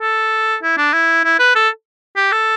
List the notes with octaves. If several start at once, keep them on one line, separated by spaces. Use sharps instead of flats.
A4
E4
D4
E4
E4
B4
A4
G4
A4